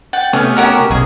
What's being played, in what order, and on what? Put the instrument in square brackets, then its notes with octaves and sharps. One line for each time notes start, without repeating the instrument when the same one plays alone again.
[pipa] F#5 [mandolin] G5 [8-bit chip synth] A6
[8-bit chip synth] C3 A3 B3 [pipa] C#4 [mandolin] F6
[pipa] C#4 F#5 A#5 [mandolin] F#4 G4 A#4
[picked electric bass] B1 [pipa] C#4 [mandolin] G#4 D#5